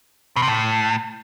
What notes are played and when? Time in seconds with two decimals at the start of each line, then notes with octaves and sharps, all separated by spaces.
0.36 B2
0.42 C3
0.48 A2